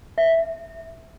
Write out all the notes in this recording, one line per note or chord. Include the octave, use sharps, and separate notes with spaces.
E5